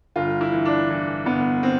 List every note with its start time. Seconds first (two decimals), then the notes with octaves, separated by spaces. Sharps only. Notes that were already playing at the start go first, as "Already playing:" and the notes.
0.16 G1 F4
0.41 E4
0.52 E3
0.65 D4
0.90 E3
1.26 G1 B3
1.63 C4